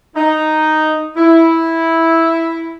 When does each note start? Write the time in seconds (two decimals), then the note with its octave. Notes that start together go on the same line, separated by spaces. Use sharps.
0.15 D#4
1.17 E4